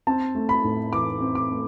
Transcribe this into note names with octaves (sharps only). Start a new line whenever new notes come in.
C4 A5
A3
B5
A2
E3 D6
C4
D6
A3